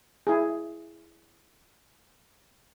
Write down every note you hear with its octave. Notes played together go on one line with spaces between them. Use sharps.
E4 G#4